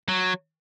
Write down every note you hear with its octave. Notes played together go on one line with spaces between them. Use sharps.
F#3